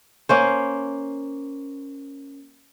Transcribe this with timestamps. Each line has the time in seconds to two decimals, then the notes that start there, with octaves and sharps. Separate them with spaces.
0.29 A#3 C#4 C5